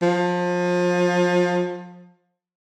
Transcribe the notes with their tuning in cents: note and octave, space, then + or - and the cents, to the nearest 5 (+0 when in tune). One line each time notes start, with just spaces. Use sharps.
F3 +30